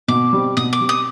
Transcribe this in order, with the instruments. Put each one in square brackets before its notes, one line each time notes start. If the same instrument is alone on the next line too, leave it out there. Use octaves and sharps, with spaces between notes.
[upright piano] B2 [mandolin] D6
[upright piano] G3 C4
[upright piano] B2 [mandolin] D#6
[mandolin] D6
[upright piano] G3 C4
[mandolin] D#6